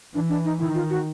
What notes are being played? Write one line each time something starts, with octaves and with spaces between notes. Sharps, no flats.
E3 D4
D4
D#4
D#3 E4
F4
F#4